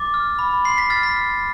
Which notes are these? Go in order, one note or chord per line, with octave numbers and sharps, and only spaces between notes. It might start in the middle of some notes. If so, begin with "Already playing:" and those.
Already playing: D6 A6
F6
B5
C6 C7
B6
F6 A6
B6
F6